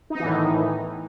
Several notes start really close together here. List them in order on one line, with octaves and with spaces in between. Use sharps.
D#4 B3 E3 A2 D#3